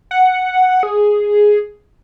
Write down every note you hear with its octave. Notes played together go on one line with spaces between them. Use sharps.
F#5
G#4